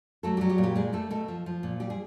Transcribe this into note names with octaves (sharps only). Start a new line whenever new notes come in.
F#3 A3 A4
F#3 G3 G4
G3 G4
A#2
G3 G4
G3 G#3 G#4
G3 A3 A4
B2 A3 A4
F3
F3
A#2
G3 G4
G#4